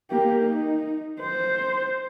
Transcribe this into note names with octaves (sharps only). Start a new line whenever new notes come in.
A#3 G4
D#4
C5